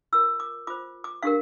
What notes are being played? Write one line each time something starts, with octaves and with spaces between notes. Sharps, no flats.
F4 A#4 E6
D6
F4 C5 D6
D6
D4 G4 A#4 F5